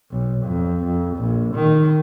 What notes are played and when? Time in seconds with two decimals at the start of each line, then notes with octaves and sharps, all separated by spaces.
0.11 B1
0.45 F2
0.84 F2
1.16 A#1
1.55 D#3